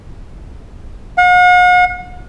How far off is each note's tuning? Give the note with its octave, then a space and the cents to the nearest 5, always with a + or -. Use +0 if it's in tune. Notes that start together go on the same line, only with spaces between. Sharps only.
F#5 -45